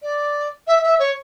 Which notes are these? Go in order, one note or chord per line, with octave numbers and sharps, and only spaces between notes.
D5
E5
E5
C#5